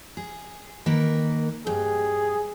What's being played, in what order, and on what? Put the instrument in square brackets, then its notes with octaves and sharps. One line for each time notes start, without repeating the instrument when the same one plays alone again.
[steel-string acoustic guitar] G#4
D#3 A#3 B4
[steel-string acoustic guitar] G2 [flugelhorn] G#4